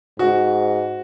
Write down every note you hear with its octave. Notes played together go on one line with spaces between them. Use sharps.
G#2 F#4